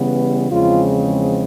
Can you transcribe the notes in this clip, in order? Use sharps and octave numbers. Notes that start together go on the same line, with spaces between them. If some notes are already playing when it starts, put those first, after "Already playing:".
Already playing: C#3 E3 G3 B3
E2 C#3 F3 G#3 C4 F4